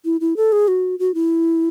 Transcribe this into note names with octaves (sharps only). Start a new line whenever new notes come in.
E4
E4
A4
G#4
F#4
F#4
E4